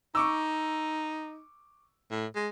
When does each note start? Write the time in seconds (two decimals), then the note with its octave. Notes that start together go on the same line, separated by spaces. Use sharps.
0.15 D#4 C#6 D6 E6
2.11 A2
2.36 G#3